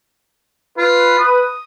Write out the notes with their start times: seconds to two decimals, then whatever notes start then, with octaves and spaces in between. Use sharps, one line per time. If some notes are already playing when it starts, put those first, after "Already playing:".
0.78 F4 B4
1.18 D#6